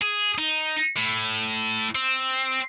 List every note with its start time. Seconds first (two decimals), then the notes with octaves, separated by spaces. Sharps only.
0.01 G#4
0.38 D#4
0.96 A2
1.95 C4